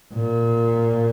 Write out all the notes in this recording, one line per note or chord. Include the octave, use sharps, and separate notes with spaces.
A#2